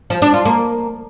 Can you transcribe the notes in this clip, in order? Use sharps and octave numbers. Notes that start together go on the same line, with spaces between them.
F3
D4
F4
A#3